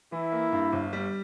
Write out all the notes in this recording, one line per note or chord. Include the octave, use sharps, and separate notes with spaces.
E3 E4
A#3
G2
G1
G3